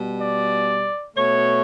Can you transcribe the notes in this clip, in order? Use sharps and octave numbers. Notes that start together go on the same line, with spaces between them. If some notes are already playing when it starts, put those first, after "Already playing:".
Already playing: B2 G3
D5
B2 A3 C#5